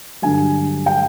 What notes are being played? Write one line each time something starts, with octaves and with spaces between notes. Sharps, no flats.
G2 D3 F#3 G#5
G5